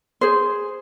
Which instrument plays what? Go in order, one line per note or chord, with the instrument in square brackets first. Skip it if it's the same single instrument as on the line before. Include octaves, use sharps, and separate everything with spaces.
[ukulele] G#4 C5